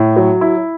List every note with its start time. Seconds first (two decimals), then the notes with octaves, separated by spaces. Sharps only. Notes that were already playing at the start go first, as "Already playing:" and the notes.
Already playing: A2
0.16 F#3
0.41 E4